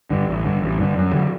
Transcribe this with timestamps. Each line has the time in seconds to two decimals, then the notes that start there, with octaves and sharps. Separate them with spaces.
0.10 G2 D3
0.27 A1
0.44 G2 D3
0.62 A1
0.79 G2 D3
0.96 F#2
1.13 D3 F#3